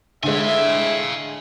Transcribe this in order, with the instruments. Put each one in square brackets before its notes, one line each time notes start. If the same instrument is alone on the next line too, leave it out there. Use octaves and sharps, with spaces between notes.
[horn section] A2 E3 E5 [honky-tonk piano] D3 G#3 [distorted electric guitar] F5 G#5